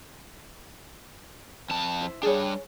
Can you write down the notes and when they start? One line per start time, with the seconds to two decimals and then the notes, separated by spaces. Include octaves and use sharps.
1.70 F2 A5
2.01 E4 C5
2.23 G3 D4 G#4 C#5